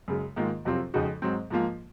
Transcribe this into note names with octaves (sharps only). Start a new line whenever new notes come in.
F#2 C#3 G#3
G#2 D#3 A#3 F4
F2 C3 F#3 C4 F4
F2 C#3 G#3 D#4 F#4
G#2 F#3 C4
G#2 F3 A#3 F4